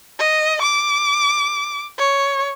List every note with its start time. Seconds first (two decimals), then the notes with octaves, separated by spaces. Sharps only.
0.19 D#5
0.62 D6
1.98 C#5